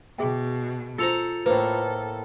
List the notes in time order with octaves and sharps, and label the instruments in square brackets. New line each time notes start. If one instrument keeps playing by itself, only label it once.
[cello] B2 [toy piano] G#4 E5 G5
[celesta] F4 C#7 F7 [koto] A4 C5 A#5
[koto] A2 A#3 [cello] A4 [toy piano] B4 C5